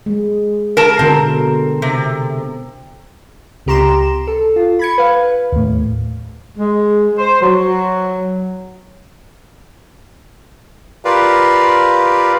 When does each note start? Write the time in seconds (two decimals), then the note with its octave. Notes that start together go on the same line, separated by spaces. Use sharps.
0.06 G#3
0.77 A#4 A5
0.99 B2 D3 C4 A#4
1.82 C3
3.66 C#2 C3 G4 A#5 C6 E7
4.27 A4
4.56 F4
4.79 B5 G#6 C#7
4.98 B4 F5
5.52 D#2 A2
6.58 G#3
7.18 C5
7.40 F#3
11.05 F4 G4 A#4 B4 D5 F5